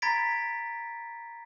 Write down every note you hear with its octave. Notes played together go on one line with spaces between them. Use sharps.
A#5 B5 G#6 A6 B6 D7